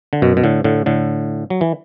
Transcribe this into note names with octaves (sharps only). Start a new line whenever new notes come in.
D3
F#2 B2
B2
A2 D3
A2 D3
A2 D3
F#3
E3